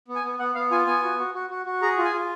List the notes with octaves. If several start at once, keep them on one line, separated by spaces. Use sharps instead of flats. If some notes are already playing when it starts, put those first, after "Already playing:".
B3
G#5
B3
B3 F#5
B3 F5
F4 G#5
B3 G#5
F#4
F#4
F#4
F#4
F#4
G#4 A#5
F4
G#5
F4